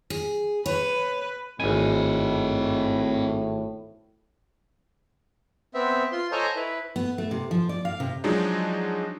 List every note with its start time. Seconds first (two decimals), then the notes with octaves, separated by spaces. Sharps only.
0.10 G#4
0.66 B4 C#5
1.60 G#1 A2 C4 D#5 G#5
5.74 B3 C4 E5
6.12 F4 C6
6.32 A4 C5 C#5 D#5 G#5 A#5
6.56 E4 B4
6.96 B3
7.18 A3
7.31 C3
7.51 F3
7.69 D5
7.85 F5
8.00 C3
8.24 F3 F#3 G#3 D4 D#4